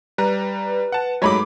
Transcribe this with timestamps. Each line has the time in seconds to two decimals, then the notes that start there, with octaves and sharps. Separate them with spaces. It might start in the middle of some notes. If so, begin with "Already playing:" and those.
0.18 G3 B4 A#5
0.92 F#5 A5
1.22 G#2 F#3 A3 C#5 B5 D6